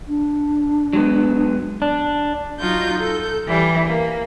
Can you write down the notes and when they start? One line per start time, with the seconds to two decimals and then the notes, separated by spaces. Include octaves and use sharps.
0.08 D4
0.93 F#3 G#3 B3
1.82 D4
2.58 F#3 D#4 F4 F#4 G6
2.98 A4 G6
3.48 E3 G3
3.87 A#3